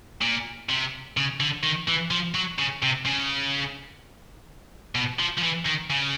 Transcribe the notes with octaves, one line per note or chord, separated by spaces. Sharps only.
A#2
C3
C#3
D3
D#3
E3
F3
F#3
C#3
C3
C#3
B2
F3
F3
E3
D#3
C#3